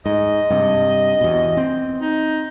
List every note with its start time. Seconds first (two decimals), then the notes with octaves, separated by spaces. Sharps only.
0.06 G#2 D#5
0.50 G2 C3
1.21 E2 B2
1.57 C4
2.01 D#4